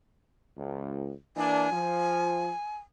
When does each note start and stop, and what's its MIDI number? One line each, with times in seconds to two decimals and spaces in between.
0.57 1.11 37
1.37 1.69 52
1.37 1.69 58
1.37 1.69 62
1.37 2.77 80
1.71 2.49 53